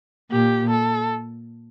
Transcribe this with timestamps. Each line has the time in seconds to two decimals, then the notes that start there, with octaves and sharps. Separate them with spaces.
0.31 A#2 G4
0.70 A4